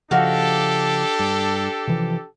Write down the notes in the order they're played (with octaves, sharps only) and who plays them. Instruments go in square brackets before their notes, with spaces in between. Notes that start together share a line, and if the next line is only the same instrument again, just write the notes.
[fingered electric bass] C#3 F3 [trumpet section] D4 G4 A4 [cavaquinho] D#4 F#4 F5
[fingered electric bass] G2
C3 E3 F3